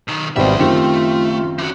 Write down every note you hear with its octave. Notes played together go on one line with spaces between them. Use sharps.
B1 D#3
G#1 B2 G3 C5 D5 E5
F#1 D#3 A3 C4 F4 G4
E3 F#4